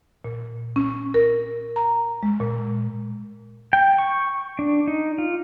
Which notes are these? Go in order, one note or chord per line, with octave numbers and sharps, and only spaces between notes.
A#2
C#4
A#4
A#5
G#3
A#2
G5
C#6
D4
D#4
F4